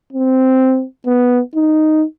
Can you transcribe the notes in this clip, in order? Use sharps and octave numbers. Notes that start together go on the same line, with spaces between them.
C4
B3
D#4